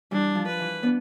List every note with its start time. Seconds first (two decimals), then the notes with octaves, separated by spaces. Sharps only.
0.11 E3 G3 D4
0.35 F3
0.47 B4
0.60 E3
0.83 B3 D4